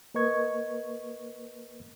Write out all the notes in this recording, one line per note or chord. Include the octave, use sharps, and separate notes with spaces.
A#3 A#4 B4 D#5 C#6 G#6